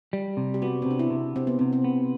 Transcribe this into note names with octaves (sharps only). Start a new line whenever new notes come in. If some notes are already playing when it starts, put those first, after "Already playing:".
G3
C3
G4
B3 F#4
C4
C3 D4
E4
C3
C3 C4
B3
C3 C4
C4
B3